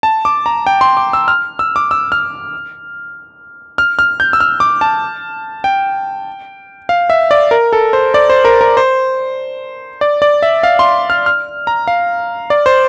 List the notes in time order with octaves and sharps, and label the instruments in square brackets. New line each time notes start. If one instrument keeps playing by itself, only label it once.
[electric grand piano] A5
D6
A#5
G5
C6
D6
E6
F6
E6
D6
E6
F6
F6
F6
G6
E6
F6
D6
A5
G5
F5
E5
D5
A#4
A4
C5
D5
C5
A#4
A#4
C5
D5
D5
E5
F5
C6
F6
F6
A#5
F5
D5
C5